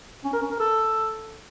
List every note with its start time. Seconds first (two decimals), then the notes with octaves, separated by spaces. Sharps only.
0.24 C#4
0.33 A#4
0.42 C#4
0.51 A#4
0.60 A4